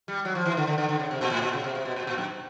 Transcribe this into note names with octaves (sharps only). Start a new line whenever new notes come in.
G3
F#3
F3
E3
D3
D3
D3
D3
C#3
C3
A#2
A2
A#2
C#3
C3
C3
B2
A#2
A#2
F#2